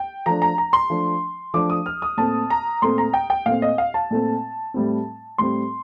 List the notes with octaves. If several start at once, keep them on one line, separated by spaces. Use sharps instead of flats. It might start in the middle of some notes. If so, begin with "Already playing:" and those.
Already playing: G5
F3 A3 D4 A#5
A#5
A#5
C6
F3 A3 D4
F3 A3 D4 D6
D#6
F6
D#6
A#2 A3 C4 A5
A#5
A#2 A3 C4 C6
A#5
G5
G5
A#2 A3 C4 F5
D#5
F5
A5
A#2 A3 C4
A2 G3 C4
A2 G3 C4 C6